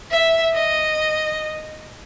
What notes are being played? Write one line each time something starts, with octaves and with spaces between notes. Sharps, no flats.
E5
D#5